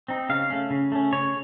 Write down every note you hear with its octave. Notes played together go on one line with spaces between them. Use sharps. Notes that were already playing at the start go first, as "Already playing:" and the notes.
C4 D#4
C#3 F5
A3 C#4
C#3
A3 C#4
C#3 C#5